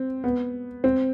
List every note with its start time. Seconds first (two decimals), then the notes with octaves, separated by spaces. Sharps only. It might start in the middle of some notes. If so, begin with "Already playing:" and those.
Already playing: C4
0.24 B3
0.84 C4